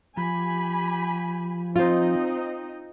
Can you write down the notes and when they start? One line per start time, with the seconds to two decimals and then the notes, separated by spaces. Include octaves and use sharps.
0.17 F3 G4 G#5 B5
1.76 C4 D#4 F4 C5 D#5